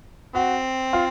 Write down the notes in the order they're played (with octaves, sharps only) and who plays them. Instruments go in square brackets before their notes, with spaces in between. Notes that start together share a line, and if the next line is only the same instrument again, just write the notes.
[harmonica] C4 [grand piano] F#4
[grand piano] F4